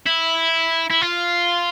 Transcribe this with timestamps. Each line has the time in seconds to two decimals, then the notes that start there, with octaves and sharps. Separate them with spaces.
0.06 E4
0.90 E4
1.01 F4